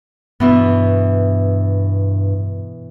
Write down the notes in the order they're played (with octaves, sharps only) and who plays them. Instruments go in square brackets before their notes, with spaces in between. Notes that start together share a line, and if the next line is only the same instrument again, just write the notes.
[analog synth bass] G2 [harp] B2 E3 B3